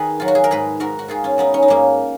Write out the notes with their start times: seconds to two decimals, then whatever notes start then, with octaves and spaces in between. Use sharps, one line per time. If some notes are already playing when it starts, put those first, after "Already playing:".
Already playing: D#3 G#4 B4
0.20 F#3 F4
0.28 F#4
0.35 G#4
0.44 A#4
0.51 G#2 G#4 B4
0.80 G#2 F#4 A#4
0.99 F#4
1.08 D#3 F4 G#4
1.24 C#4 F4
1.38 F#3 B3 D#4
1.54 C#4
1.62 D#4
1.68 G#2 A#3 C#4